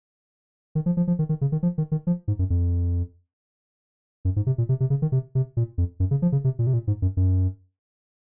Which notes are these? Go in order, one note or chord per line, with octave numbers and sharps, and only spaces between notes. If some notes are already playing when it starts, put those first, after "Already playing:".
D#3
F3
F3
F3
D#3
D#3
C#3
D#3
F3
D#3
D#3
F3
G#2
F#2
F2
F#2
G#2
C3
A#2
C3
C3
C#3
D#3
C3
C3
A#2
F2
F#2
C#3
F3
C#3
C3
A#2
C3
A#2
G#2
F#2
F#2